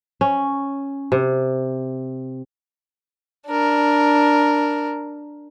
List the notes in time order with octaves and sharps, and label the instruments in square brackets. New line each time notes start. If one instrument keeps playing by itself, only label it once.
[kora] C#4
C3
[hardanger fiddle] D4 A#4